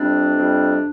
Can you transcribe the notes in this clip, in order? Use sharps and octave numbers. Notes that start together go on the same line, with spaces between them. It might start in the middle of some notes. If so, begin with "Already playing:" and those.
Already playing: F2 C3 G3 C4 D4
F2 C3 G3 C4